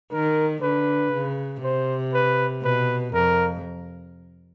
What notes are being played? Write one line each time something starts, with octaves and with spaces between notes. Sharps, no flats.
D#3 A#4
D3 B4
C#3
C3 C5
B4
B2 B4
F2 A#4